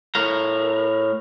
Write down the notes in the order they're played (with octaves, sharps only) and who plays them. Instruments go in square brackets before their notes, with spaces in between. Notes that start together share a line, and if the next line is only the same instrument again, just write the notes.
[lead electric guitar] A2 A#4